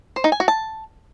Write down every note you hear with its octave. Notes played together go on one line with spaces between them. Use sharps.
C5
D#4
G#5
F#4
A5